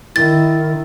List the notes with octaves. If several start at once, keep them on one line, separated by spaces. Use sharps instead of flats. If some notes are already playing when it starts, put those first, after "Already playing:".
D#3 E4 A6